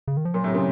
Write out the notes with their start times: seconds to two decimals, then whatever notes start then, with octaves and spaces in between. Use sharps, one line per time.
0.08 C#3
0.17 D#3
0.25 F3
0.34 A#2 F#3
0.44 A2 C3
0.54 A#2 C#3